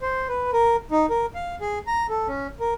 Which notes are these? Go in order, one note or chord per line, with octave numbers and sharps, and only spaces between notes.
C5
B4
A#4
D#4
A#4
F5
G#4
A#5
A4
C#4
A#4